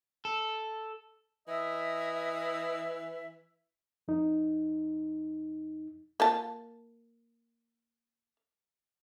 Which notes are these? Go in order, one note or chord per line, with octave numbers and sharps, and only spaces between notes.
A4
E3 D#5 E5
F2 D#4
A#3 F4 A5